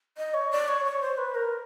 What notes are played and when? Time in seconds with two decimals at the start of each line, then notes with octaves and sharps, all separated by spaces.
0.18 D#5
0.34 C#5
0.51 D5
0.68 C#5
0.85 C#5
1.01 C5
1.18 B4
1.35 A#4